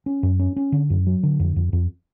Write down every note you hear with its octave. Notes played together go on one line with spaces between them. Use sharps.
C#4
F#2
C#4
C#4
D3
F#2
F#3
D3
F2
F2
F2